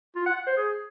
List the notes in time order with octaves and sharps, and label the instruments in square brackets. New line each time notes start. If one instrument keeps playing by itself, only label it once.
[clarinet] F4
F#5
F#5
C5
G#4